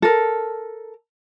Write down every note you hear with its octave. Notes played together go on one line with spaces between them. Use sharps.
A4 A#4